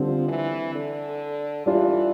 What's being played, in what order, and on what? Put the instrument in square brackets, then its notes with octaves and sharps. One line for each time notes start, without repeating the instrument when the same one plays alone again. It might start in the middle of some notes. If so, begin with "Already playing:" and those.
Already playing: [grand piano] D3 G3 C4 [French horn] F3
[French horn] E3
D3
[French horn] E3 [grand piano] G3 D4 F4